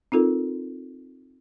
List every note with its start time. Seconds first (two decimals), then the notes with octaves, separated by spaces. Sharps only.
0.12 C4 D#4 F4 A4 A#4